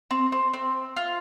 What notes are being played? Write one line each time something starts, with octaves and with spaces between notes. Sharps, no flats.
C4
C4
C4
F4